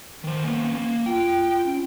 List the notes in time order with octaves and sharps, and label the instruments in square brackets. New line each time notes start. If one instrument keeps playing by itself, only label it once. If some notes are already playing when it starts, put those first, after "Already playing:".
[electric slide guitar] D#3 C5
A#3 B3 C#4
A#3
[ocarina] F4 [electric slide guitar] G5
[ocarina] C#4